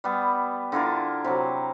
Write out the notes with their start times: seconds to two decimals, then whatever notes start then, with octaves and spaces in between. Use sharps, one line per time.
0.04 G3 B3
0.72 D3 E4 F4 A#4
1.24 C3 F#3